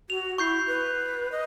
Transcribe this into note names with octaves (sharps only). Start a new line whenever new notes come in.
F#4 F7
E4 C#6 G6 C7
B4
D#5